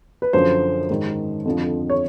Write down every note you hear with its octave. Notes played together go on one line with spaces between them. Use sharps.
B4
F#2 D3 F3 C5
G#2 D#3
F2 D3 F3
C#5